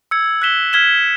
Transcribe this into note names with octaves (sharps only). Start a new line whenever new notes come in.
E6 G#6 C#7
F#6 B6 E7 G7
F6 G#6 B6 E7 G7